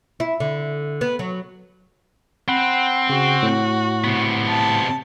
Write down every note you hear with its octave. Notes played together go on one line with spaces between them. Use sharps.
E4
D3
B3
F#3
C4 F#5 B5 F#6
C#3 F#4
A2
C3 B3
A5